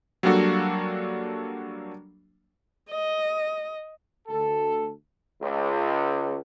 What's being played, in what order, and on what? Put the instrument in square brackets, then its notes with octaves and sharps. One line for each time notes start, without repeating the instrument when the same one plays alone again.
[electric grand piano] F#3 G3 A#3 D4 F#4 A4
[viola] D#5
[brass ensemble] D2 A4
[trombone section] C#2